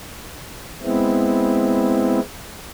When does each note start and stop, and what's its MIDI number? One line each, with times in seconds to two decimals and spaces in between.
0.82 2.20 56
0.82 2.20 59
0.82 2.20 60
0.82 2.20 64